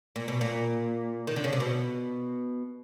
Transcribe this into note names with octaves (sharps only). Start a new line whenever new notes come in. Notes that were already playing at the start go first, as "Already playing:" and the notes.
A#2
B2
A#2
D#3
D3
C#3
C3
B2